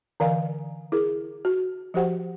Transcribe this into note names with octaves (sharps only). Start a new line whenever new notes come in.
D3 E3 A#4 D5 F5 G#5
E4 G#4 A#4
F#4
F3 F#4 G4 C5 F#5 G5